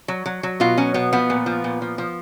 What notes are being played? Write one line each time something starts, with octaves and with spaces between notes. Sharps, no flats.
F#3
F#3
F#3
B2 F4
F#3 C#4
B2 B3
F3 B3
A#2
F3
A#2
F3
F3